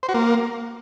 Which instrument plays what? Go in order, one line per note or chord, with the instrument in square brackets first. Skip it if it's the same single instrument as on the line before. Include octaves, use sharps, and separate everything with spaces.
[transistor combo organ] C5
F#4
A#3